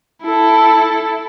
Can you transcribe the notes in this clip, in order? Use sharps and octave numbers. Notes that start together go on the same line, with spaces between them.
E4 A4